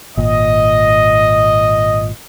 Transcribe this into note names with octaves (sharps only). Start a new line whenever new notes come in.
G#1 A#2 D#5